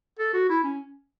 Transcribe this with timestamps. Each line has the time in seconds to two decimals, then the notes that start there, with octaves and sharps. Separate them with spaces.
0.19 A4
0.33 F#4
0.49 E4
0.63 C#4